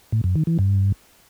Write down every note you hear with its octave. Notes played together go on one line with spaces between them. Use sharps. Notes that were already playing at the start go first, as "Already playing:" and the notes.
A2
F#2
D#3
E3
G2